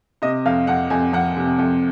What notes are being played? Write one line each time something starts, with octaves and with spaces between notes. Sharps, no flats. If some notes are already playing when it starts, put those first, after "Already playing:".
C3 D#5
F2 F5
F2 F#5
F2 G#5
F2 F#5
C3
F2